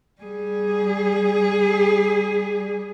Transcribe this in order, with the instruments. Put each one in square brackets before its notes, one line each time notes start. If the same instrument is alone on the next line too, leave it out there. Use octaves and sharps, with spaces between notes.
[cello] G3 G#4